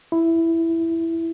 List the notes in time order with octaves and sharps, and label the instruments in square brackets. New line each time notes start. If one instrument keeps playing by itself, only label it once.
[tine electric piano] E4